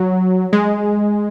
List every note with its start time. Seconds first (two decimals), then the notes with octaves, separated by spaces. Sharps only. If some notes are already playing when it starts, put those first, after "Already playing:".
Already playing: F#3
0.53 G#3